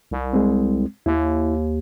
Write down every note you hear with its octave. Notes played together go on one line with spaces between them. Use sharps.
C2
G#3 C4
D#2 E4